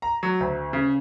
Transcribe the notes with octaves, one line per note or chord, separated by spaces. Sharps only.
A#5
F#3
D2
C#3